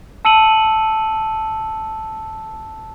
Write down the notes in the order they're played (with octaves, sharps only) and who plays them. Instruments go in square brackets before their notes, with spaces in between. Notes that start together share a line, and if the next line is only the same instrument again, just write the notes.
[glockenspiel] A5 E6 C#7 D#7 F#7